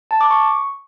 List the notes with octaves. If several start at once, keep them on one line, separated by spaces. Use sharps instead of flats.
A5
D6
C#6